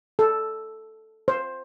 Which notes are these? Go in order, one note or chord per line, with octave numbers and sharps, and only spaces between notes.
A4
C5